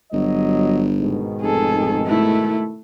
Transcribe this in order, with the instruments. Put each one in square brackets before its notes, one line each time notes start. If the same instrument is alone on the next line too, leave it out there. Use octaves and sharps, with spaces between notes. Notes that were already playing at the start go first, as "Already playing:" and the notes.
[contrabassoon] G1 [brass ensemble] F#3 D#5
[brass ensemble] G#2 B2 D#3
[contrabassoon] F1 [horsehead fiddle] G#4 A4
[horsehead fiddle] A3 E4